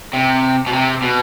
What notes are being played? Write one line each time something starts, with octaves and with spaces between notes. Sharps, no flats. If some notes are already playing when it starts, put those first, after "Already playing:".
C3
B2
C3
B2